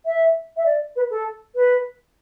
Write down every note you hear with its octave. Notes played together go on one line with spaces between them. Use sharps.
E5
E5
D5
B4
A4
B4